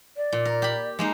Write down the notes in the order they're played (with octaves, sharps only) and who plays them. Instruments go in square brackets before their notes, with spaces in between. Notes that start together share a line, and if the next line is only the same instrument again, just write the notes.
[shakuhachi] D5
[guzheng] A#2
A#4
G4 B5
G#3 A#3 D#4